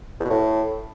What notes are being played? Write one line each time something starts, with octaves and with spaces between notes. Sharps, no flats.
E2
B2
A2